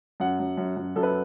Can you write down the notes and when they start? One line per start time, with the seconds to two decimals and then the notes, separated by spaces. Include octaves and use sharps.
0.20 F#2 F#5
0.40 F#2
0.57 F#2
0.77 F#2
0.96 F#2 A4
1.03 B4